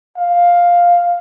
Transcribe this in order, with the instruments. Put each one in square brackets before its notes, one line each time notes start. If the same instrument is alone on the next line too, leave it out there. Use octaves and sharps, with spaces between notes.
[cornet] F5